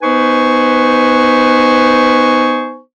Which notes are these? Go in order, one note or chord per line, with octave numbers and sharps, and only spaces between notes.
B3 D#4 B4 C5 G#5 C#6